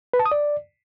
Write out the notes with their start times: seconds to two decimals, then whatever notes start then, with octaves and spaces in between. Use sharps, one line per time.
0.14 B4
0.20 A5
0.26 D#6
0.32 D5